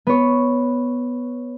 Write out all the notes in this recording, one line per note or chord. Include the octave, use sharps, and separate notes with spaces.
B3 C#5